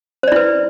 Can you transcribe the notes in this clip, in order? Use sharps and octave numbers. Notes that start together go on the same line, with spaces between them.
E4 B4 C5 D5